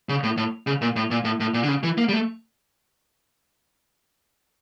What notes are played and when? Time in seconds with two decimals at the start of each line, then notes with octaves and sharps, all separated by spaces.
0.09 C#3
0.23 A2
0.37 A2
0.67 C#3
0.82 A#2
0.96 A2
1.11 A#2
1.24 A2
1.40 A2
1.54 A#2
1.63 D3
1.68 C#3
1.83 E3
1.98 A#3
2.09 G3
2.13 A3